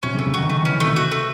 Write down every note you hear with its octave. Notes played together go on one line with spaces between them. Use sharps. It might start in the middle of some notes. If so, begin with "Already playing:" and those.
C3 C#4
C#3
A3
C#3
D#3 F#4
D#3 A3
E3 C#4
D#3
C3 A3
F#4
A3